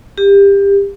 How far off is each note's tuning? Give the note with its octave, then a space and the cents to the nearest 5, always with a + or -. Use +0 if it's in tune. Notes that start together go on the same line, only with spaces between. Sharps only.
G4 +25